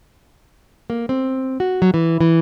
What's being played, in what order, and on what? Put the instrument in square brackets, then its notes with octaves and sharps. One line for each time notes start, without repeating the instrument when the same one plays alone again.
[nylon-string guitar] A#3
C4
F#4
F#3
E3
E3